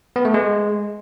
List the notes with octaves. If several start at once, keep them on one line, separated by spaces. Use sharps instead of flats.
B3
A3
G#3